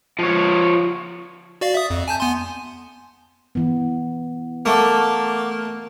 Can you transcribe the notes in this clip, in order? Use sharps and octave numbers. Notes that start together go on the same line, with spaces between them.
F3 C#5
F#4 D5 F5
E5 D#6
F2
G#5 A5 G6
B3 G#5 C6
E3 B3
A3 A#3 E5 F#5 C#6 D6